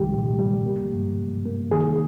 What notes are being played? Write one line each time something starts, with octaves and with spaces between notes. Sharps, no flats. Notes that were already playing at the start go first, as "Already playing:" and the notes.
Already playing: C2 C3 D#3 G3 G4
A#2
G3
A#3
G2
G2
A#3
D#3 G#4